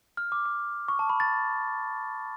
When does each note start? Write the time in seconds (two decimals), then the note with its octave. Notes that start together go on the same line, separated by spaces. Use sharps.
0.17 F6
0.32 D6
0.46 D6
0.88 C#6
0.99 A5
1.09 B5
1.20 A6